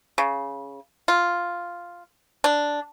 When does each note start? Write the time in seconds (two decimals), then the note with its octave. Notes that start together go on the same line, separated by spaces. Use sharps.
0.18 C#3
1.08 F4
2.44 D4